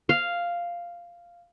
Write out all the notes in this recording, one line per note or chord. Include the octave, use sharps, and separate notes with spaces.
F5